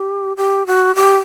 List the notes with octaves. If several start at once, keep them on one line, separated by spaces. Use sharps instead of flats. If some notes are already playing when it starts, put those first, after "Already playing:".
Already playing: G4
G4
F#4
G4